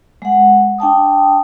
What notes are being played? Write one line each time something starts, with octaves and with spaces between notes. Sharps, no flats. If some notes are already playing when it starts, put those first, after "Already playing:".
G#3 F#5
D4 G5 A5 D#6